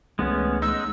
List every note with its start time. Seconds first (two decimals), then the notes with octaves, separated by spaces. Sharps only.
0.19 C#2 E3 G#3 A3 B3 C#4
0.62 G#3 D#4 E6